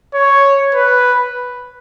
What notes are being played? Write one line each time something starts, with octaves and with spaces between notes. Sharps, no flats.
C#5
B4